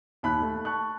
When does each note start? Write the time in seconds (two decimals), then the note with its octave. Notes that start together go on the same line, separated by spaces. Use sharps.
0.23 D#2 B5 F#6
0.42 A3
0.65 A5 C#6 F#6